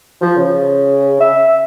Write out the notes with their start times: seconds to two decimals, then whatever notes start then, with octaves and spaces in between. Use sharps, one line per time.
0.22 F3
0.36 C#3
1.20 E5